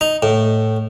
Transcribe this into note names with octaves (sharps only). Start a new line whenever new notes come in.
D#4
A2